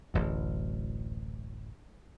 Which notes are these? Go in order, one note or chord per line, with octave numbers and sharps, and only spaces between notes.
D1 A1 F#2